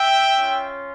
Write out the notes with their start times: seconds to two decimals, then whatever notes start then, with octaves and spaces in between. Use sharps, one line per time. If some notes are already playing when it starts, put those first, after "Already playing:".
Already playing: E5 G5
0.35 C#4 F4